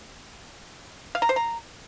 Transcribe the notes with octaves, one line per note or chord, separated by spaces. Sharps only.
F5
A#5
C5
A#5